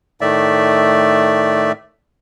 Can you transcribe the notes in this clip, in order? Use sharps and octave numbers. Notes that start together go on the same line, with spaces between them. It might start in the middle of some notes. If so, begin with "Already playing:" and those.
A2 D#3 A3 D5 E5